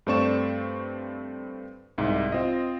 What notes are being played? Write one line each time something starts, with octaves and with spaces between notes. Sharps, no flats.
G2 A3 C4 D5 C#6 E7
C2 G#2
C4 F4 D#5